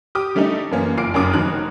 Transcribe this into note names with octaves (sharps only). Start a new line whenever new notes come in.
G4 D6 D#6
D3 G3 A3 C#4 D#4 A4
F#2 E3 A#3 C#4
F#1 F4 D6 C7 D7
F#1 F#2 C#4 A#4 D6 D#6
F1 D#3 F#3 F#6